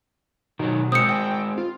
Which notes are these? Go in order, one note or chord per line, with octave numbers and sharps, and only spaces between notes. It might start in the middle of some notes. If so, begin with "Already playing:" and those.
B2 D#3 F#3
G#3 C4 D#6 G6 C#7
G5
F4